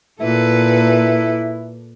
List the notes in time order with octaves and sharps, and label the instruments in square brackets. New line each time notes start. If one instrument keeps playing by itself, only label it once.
[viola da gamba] A#2 A4 B4 [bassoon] E4